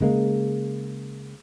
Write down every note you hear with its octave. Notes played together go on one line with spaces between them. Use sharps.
C#3 G#3 A#3